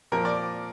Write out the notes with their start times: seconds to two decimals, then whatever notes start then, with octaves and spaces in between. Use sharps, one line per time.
0.12 A#2 F3 A#4
0.25 D5